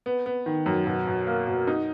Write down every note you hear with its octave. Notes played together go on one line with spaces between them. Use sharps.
B3
B3
D#3
F#2
B2
B2
A#3
B2
D#4